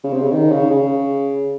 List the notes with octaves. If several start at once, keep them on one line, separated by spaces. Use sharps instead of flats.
C#3
C3
C#3
D#3
C#3
C#3